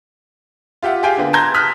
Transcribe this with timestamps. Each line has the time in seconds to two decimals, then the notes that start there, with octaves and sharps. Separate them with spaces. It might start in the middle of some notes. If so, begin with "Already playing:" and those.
0.82 F4 G4 E5 F#5
1.03 F4 G4 G#4 F5 G5 G#5
1.17 D3 A#3 B3
1.33 A5 A#5 C6 G6 G#6 A#6
1.54 D#6 F6 F#6 B6